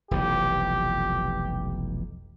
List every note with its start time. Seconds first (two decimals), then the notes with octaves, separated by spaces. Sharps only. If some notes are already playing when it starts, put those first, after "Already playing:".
0.11 F1 B1 E3 G4